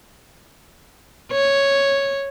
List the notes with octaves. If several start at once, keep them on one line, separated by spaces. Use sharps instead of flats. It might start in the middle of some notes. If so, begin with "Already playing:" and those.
C#5